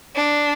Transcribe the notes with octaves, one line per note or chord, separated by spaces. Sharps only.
D4